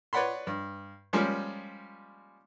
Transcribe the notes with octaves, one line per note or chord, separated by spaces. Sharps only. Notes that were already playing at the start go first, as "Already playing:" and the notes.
B4 C#5 D5 F#5 B5 C6
G2
F3 G3 G#3 A#3 C#4